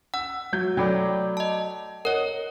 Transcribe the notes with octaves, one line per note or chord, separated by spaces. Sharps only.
F#5 E6
F#3 G6 G#6
F#3 A3 D5 G5 B5 D6
D#5 A5
A#4 C#5 D#5 F#5